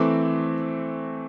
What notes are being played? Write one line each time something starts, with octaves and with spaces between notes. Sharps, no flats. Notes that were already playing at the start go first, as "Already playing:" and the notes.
Already playing: E3 A3 C4 D6